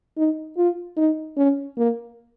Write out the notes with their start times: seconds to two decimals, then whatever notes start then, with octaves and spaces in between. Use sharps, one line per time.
0.17 D#4
0.57 F4
0.97 D#4
1.37 C#4
1.77 A#3